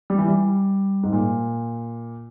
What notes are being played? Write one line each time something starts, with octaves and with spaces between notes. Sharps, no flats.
G3
E3
G3
G#2
A#2